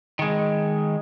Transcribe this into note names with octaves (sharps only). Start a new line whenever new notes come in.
D#3 G#3